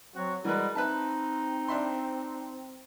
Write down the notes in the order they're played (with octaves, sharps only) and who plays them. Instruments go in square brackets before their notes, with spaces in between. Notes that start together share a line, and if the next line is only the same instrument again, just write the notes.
[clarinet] F#3 [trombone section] C4 F#4
[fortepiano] E3 B4 [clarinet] G3 [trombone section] G#3 F#4 A#4
[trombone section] C4 [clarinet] D#4 [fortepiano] B4 E5 A5
[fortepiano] D4 E5 C6